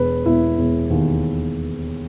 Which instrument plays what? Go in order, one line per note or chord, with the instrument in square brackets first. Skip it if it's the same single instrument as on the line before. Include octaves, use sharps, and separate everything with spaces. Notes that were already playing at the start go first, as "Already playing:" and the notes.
Already playing: [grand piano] E1 B4
E1 E4
E1
D#2